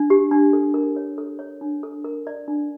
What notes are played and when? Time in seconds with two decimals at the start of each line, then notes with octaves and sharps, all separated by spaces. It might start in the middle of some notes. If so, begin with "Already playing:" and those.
Already playing: D4
0.10 G4
0.31 D4
0.53 A4
0.74 A#4
0.96 C#5
1.18 A4
1.39 C#5
1.61 D4
1.83 A4
2.04 A#4
2.27 D5
2.48 D4